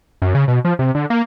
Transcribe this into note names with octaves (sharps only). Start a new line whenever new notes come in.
F#2
C#3
B2
F3
C3
D3
A#3